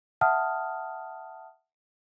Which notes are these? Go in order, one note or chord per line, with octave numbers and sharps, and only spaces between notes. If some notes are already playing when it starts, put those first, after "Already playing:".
E5 F#5 A5 D#6 F6